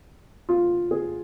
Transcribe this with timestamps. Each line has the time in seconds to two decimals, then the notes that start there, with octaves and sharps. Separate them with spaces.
0.49 F4
0.91 G#4